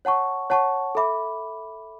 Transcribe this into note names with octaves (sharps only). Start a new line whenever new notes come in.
C#5 F#5 A5 C#6
C#5 F#5 A5 C#6
A4 E5 B5 D6